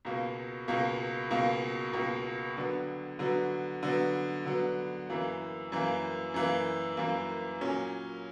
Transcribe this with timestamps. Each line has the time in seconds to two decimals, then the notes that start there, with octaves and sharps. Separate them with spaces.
0.05 C#2 B2 A#3
0.68 C#2 B2 A#3
1.31 C#2 B2 A#3
1.93 C#2 B2 A#3
2.57 D3 F#3 B3
3.19 D3 F#3 B3
3.83 D3 F#3 B3
4.46 D3 F#3 B3
5.09 F#2 E3 A#3
5.72 F#2 E3 A#3
6.34 F#2 E3 A#3
6.97 F#2 E3 A#3
7.61 A#2 F#3 C#4